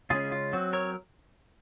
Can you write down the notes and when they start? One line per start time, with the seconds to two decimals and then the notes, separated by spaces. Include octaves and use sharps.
0.10 C#3 G#3 C#4 F4 G#4
0.32 F4
0.53 F#3 C4 F#4
0.73 A#4 C#5